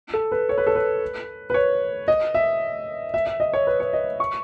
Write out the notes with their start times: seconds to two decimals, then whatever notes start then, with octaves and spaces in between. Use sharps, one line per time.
0.14 A4
0.32 B4
0.49 C#5
0.58 B4
0.67 A4
0.75 B4
1.50 B4
1.54 C#5
2.08 D#5
2.35 E5
3.14 E5
3.27 E5
3.40 D#5
3.53 C#5
3.67 B4
3.80 C#5
3.93 D#5
4.20 C#6